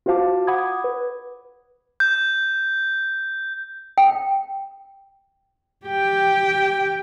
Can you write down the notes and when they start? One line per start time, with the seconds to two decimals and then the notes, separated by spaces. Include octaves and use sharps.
0.06 F4 F#4 C5 F5 A5 D6
0.47 F#5 B5 D6 D#6 G#6
0.84 B4
2.00 G6
3.98 G5
5.86 G4 G5